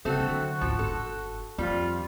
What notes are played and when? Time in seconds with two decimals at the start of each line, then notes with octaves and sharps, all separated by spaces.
0.05 C#3 A3 C4 F#4 A4
0.20 D3 F#3
0.61 A1 D2 F3
0.79 G1 A4
1.58 F2 G3 F4